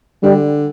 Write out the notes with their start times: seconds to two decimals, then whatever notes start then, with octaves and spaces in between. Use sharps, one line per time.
0.23 D3 G3